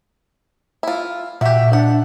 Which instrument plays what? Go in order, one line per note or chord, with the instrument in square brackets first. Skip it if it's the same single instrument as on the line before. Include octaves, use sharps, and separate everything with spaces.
[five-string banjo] E4 F4
[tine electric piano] A#2 [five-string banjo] F#4 G4 [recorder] E5
[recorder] D4 [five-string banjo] F#5